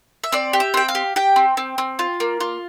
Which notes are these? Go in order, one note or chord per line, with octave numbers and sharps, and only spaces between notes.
E5
C4 D5
G4
E5
C4 G5
F5
G4
G4 G5
C4
C4
C4
F4
A#3
F4